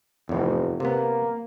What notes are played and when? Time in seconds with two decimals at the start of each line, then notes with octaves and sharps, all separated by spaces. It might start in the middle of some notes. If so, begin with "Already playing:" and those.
0.29 F1 E2 A2
0.80 C3 A#3 B3